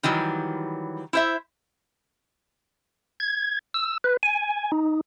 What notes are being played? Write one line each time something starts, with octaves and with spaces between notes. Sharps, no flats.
D#3 E3 F#3 G3
E4 C5 E5
G#6
E6
B4
G#5
D#4